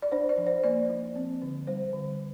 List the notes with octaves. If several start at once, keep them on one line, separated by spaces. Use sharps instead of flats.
D5
D4 C5
D5
F3
C5
A#3 D5
F3
C4
D3
G3 C5
D3